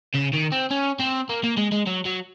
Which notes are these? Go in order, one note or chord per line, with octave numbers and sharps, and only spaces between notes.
C#3
D#3
C4
C#4
C4
A#3
A#3
G#3
G#3
F#3
F#3